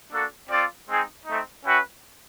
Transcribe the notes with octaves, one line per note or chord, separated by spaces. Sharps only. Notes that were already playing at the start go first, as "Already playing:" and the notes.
A#3 D4 F#4 A4
C4 F4 A4 D5
G#3 C4 D#4 G#4
A3 C4 D#4
C#4 F#4 B4 E5 G5